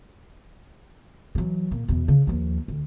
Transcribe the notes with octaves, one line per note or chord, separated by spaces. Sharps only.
E3 F#3
A#2
E2 B2
C#3
D#2 F3
D2